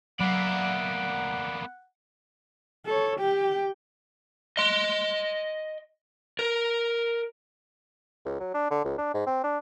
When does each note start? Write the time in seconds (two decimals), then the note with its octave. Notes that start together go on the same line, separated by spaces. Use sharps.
0.20 F#3 A#3 B3 D5 E5 F#5
2.86 A4 C#5
3.19 G4 G5
4.57 D#5 C6
6.39 A#4
8.26 C#2
8.40 F#3
8.54 D4
8.71 D3
8.85 C#2
8.98 D4
9.14 G#2
9.27 C4
9.44 D4